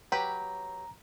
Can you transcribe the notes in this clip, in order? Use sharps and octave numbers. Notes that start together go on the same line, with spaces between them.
F#3 G4 B4 A#5